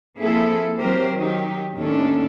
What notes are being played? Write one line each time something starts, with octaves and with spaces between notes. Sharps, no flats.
F3 A#3 C4 E4 G#4 A4
E3 F#3 C4 G4 A#4 C5
D#3 F#3 D#4 G4
D#2 A2 D#3 C#4 D4 A4